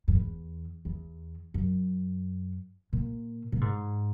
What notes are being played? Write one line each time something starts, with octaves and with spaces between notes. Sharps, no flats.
F#2
E2
E2
F#2
A#2
A#2
G#2